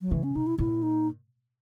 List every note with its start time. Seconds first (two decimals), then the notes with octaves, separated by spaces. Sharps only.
0.01 F#3
0.11 C#3 E3
0.23 C#4
0.35 B2 D#4
0.47 E4
0.58 A#2 E4
0.83 D#4